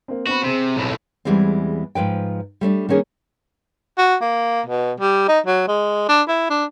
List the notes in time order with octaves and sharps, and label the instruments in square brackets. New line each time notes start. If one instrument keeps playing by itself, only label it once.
[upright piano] A#3 C4
[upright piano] B3 C4 B5 [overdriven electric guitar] F#4
[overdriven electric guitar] C3 [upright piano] C4 G#4
[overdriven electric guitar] B1 A2
[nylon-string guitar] E2 G#2 E3 G3 G#3 C4
G#2 F3 B4 G5
G3 A3 C4 D4
D#3 A#3 C#4 G#4
[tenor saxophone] F#4
A#3
B2
G3
D#4
F#3
G#3
D4
E4
D4